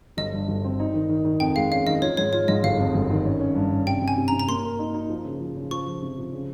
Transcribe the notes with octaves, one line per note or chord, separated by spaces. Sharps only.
G1 D#5
G2
G1
C4
D#4
D#3
D#3
D#3
F2 G5
G#3 F5
C#4 F5
D#3 D#5
F4 C#5
G#2 C#5
F4 C#5
G#2 D#5
G1 F5
F2
G1
D#3
C#4
C#4
G2
C#4
C3 G5
C3
G#5
C3
A#5
C3
A#5
A#3 C6
A#4
D#4
D#4
F3
C#3
F3
C#3
F3 C#6
F3
C3
F3
C#3